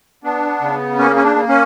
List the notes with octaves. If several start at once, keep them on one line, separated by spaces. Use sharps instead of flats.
B3 D4
C#3
A#3 C#4
C#4
D4
A#3
C#4